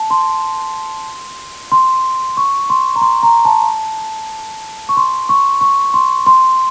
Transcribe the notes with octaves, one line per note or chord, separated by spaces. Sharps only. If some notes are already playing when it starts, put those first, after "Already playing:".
Already playing: A5
C6
C6
C#6
C6
A#5
C6
A#5
A5
C#6
C6
C#6
C#6
C6
C6